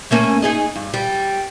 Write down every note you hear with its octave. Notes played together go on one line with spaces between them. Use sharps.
A3 A#3 C#4
D#4 G#4 D#5
G2
G3